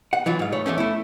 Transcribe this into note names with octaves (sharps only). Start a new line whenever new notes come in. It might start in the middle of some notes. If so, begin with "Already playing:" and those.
F#5
E3 F#3 F4
G#2 F5
A3 C#5
E2 G2 A3 C#4
A3 E4